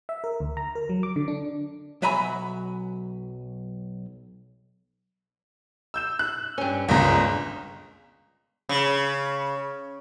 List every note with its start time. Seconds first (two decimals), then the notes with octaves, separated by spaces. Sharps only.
0.09 E5
0.24 A#4
0.40 D2
0.57 A#5
0.75 A#4
0.89 F#3
1.03 D6
1.16 D3
1.28 D4
2.02 B1 F#3 E5 G#5 A#5 B5
5.94 E6 G6 E7
6.19 F#6
6.58 G2 C#4
6.89 G1 C#2 A#2 D#5 A#5
8.69 C#3